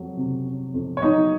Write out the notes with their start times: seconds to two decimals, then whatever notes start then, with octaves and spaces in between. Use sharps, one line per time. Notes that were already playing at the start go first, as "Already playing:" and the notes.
Already playing: F2 F#3
0.17 C3
0.45 C#4
0.74 F2
0.97 C#5
1.02 F#3 D#4 D#5